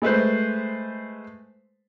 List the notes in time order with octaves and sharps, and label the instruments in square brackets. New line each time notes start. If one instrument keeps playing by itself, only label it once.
[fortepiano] G#3 A3 B4 C5